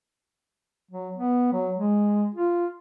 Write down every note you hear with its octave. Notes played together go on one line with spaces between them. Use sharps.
F#3
B3
F#3
G#3
F4